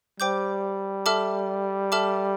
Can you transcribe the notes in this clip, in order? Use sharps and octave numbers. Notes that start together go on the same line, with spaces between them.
G3 C5 G5 D6 G6
A4 E5 A5 D6 F6
A4 E5 A5 D6 F6